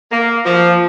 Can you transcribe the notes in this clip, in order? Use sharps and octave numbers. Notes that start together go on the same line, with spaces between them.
A#3
F3